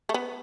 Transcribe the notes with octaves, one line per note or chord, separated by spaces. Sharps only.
A3
B3